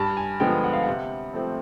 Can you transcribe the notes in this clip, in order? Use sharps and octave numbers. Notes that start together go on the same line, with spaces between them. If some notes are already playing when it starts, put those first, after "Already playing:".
Already playing: G2 A5
G#5
D3 F3 G#3 B3 G5
F#5
F5
C3 F#5
F3 A3 C4